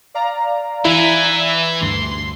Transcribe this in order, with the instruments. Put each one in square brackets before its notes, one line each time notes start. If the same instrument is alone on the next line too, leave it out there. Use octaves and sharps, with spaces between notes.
[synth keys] D5 F5 A#5
[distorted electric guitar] E3 [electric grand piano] E4 [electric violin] E5 G#5
[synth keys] D2 G2 [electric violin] C6